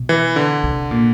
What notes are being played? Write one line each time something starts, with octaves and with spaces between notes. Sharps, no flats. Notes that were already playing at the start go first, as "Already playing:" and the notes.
Already playing: B2
E3
D3
C3
A#2